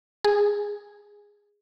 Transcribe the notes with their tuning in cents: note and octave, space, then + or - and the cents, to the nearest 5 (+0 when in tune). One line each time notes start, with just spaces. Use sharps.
G#4 -10